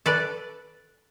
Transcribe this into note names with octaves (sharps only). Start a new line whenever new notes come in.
A4 B4 D5